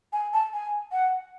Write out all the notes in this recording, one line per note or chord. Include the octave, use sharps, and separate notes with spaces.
G#5
A5
G#5
F#5